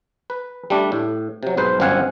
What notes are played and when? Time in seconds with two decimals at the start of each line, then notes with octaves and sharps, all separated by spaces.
0.30 B4
0.70 G3 A3 D4
0.92 A2
1.43 C3 F#3
1.57 B1 G#2 B4 C5
1.80 G1 F#2 C4 F5 F#5 G#5